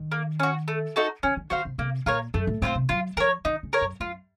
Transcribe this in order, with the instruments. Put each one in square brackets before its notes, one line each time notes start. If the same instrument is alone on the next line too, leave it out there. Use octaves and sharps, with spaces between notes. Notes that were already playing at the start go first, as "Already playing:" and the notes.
Already playing: [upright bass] D#3
[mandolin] A#3
C#4 F#4
A3
D#4 F#4 A4
[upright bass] D#3 [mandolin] C#4
[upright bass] D#3
[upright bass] D#3 [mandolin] F#4 C5 F5
[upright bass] C3
[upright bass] C3 [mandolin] A#3
[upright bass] A#2 [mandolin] F4 A#4 C#5
[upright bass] F#2 [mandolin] A3
[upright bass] A2
[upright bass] A2 [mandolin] C4 F4 C5
[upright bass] C3
[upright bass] F#3 [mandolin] F4
[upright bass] F3 [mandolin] A#4 C#5
[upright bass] D#3 [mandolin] D#4
[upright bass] C#3
[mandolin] A#4 C#5
[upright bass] F#2
[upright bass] F#2 [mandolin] F4